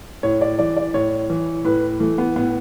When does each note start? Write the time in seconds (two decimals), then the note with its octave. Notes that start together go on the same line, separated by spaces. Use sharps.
0.23 A2 C#5
0.41 D5
0.59 E3 D5
0.77 D5
0.94 A2 C#5
1.30 E3
1.65 A2 B4
2.00 E3 A3
2.18 B3
2.36 A2 B3